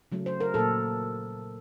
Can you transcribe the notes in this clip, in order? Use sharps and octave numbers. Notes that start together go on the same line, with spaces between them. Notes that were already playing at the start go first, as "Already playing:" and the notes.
C#3 F#3 A3
C5
A#4
A#2 F#3 A#3 A4